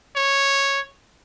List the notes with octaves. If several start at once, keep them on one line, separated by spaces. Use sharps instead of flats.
C#5